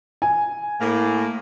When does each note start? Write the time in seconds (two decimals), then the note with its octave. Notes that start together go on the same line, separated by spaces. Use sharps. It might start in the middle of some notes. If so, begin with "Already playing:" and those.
0.22 G#5
0.81 A2 A#3